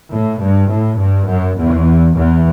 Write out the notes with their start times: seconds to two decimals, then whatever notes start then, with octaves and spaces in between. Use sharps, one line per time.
0.13 A2
0.42 G2
0.72 A2
1.00 G2
1.29 F#2
1.58 E2
2.17 E2